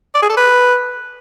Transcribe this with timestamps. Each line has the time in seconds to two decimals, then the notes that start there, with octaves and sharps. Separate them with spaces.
0.15 D5
0.22 G#4
0.30 A4
0.37 B4